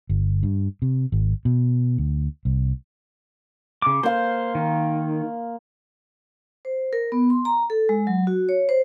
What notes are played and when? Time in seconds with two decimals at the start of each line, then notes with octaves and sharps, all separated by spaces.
0.10 G1
0.43 G2
0.82 C3
1.12 G#1
1.45 B2
1.98 D2
2.45 C2
3.82 C#3 D6
4.03 A#3 C5 F5 C6
4.55 D#3
6.65 C5
6.93 A#4
7.12 B3
7.30 C6
7.45 A#5
7.70 A4
7.89 G#3
8.07 F#3
8.27 F#4
8.49 C#5
8.69 C5